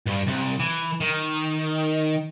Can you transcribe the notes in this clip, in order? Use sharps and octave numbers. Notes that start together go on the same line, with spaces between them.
G2
C2
E3
D#3